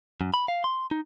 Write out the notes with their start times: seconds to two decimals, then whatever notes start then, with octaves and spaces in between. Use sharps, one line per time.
0.21 F#2
0.34 B5
0.48 F5
0.64 C6
0.91 D#4